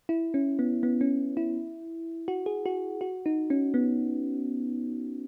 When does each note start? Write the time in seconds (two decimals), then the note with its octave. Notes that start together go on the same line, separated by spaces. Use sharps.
0.09 E4
0.34 C#4
0.59 B3
0.83 B3
1.01 C#4
1.37 E4
2.28 F#4
2.46 G#4
2.66 F#4
3.01 F#4
3.26 D#4
3.50 C#4
3.74 B3